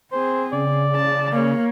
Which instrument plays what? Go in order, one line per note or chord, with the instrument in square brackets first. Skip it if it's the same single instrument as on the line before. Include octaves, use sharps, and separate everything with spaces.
[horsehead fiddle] C4 G#4 [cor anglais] C5
[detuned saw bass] C#3 [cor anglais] D5
[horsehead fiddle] A5
A#3 C#5